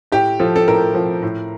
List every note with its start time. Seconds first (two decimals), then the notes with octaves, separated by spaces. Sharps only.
0.12 A2 G4
0.40 F3 A4
0.56 A4
0.68 A2 A#4
0.94 F3
1.22 A2